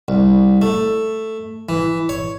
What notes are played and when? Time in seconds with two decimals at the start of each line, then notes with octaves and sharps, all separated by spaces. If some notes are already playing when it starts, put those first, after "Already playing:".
0.08 C2
0.62 A3
1.69 E3
2.09 C#5